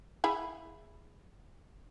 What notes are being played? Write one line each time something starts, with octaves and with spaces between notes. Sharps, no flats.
E4 G#4 B5